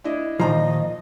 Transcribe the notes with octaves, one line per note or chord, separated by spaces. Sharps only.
D4 E4 D#5
A#2 D#3 F3 D#5 A5 A#5 C6